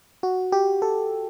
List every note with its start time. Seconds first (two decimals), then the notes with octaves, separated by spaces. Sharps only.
0.23 F#4
0.52 G4
0.82 A4